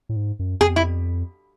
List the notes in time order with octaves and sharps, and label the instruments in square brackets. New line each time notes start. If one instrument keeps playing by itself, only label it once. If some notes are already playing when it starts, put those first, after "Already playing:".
[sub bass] A2
G#2
F#2
[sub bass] F2 [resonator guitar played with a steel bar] G#4
[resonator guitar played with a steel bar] E4